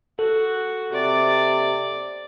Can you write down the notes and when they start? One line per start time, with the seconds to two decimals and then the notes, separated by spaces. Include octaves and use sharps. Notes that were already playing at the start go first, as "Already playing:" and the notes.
0.19 F#4 A4
0.92 C3 D5